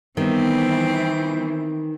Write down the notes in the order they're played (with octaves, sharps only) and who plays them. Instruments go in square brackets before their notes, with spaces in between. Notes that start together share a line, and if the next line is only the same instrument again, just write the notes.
[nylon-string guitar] D#3 [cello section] E3 [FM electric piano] G3 B3 [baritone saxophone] C4